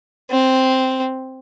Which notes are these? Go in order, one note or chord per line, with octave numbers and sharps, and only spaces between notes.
C4